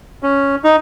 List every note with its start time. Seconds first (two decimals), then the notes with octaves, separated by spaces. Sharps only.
0.23 C#4
0.64 D#4